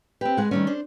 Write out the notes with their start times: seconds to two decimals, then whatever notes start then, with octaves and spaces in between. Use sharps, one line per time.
0.21 C4 G4 B4
0.37 G#3 F#5
0.51 D#3 G3 A3 C#4
0.67 D4 C5